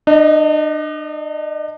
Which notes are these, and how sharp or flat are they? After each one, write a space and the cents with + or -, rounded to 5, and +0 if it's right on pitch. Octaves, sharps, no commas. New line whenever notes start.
D4 +40 D#5 +5